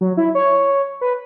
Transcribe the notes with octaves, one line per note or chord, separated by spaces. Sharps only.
F#3
E4
C#5
B4